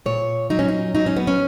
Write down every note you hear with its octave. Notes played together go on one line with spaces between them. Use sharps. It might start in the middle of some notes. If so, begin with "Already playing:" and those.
A#2 C#5
F#3 D#4
C#4
D#4
F#3 D#4
C#4
B3
C#4